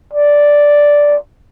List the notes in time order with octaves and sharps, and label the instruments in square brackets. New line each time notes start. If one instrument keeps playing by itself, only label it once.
[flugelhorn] D5